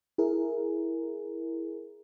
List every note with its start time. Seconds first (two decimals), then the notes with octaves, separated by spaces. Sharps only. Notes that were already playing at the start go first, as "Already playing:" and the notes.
0.18 E4 G#4 A#4